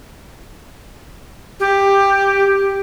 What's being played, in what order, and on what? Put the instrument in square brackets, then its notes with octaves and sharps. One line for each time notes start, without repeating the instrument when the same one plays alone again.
[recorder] G4